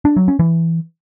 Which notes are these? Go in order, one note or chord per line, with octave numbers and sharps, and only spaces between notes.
D4
F#3
C#4
E3